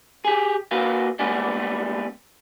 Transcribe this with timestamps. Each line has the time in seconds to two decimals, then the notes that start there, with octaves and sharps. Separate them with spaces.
0.25 G4 G#4
0.71 A#3 F#4 B4 F5
1.19 G3 G#3 A#3 B3 C#4